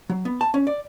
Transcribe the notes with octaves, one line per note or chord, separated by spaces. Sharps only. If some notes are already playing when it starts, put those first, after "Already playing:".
F#3
B3
A5
C#4
D5